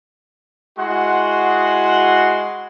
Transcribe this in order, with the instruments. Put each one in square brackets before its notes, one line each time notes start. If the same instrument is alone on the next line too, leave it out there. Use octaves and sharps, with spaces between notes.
[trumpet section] G#3 E4 F#4 F#5 C6